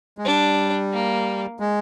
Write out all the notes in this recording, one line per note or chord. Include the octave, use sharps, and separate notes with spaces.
G#3
G3 D4
A#3
G#3